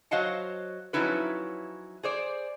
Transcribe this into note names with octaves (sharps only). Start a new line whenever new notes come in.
F#3 C5 D#5 F5 F#5 A5
F3 F#3 C#4 D#4 E4 B4
G#4 C5 D5